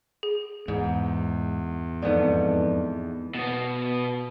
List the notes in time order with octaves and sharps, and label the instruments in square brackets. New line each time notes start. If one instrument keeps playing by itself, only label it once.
[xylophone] G#4
[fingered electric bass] E2 [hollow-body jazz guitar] G#2
[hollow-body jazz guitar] F2 G#2 B3 [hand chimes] D#4 A4 D5
[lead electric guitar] B2 B3